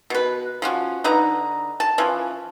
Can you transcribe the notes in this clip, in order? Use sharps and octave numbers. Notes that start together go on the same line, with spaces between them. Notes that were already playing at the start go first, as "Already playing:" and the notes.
B2 B4
F3 C#4 F#4
D3 D#4 B4 A#5
A5
E3 F3 C#4